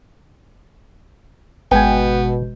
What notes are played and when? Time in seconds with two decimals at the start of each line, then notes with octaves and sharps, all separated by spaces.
1.71 G#1 B2 G#3 B3 G5 G#5 G6